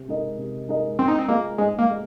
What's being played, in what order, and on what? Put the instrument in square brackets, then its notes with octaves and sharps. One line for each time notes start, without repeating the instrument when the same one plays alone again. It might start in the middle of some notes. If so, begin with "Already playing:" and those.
Already playing: [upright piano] C3
G#3 D#4 A#4 D#5
C3
G#3 D#4 A#4 D#5
[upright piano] G#2 [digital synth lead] C4
[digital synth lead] D#4
C4
[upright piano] G#3 F4 G#4 D#5 [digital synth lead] A#3
[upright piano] G#2 [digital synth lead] G#3
[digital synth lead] A#3
[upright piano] G#4 D#5